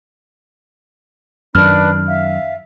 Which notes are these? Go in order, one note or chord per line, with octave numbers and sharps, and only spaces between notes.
F#2 D#3 D4 B4 B5 F6
E5 F5